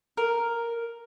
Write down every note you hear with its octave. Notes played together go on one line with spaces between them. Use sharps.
A#4